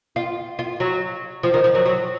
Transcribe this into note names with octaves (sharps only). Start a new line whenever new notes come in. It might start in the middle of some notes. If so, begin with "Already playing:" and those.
F4
F4
F#3
F3
D#3
F3
F#3
F#3